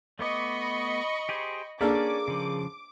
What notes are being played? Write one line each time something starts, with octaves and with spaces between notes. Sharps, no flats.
A3 B3 D#5 B5 C#6 D6
G4 G#4 C5
A#3 C#4 D4 G#4 A4 D5 D6 F6
C#3 F3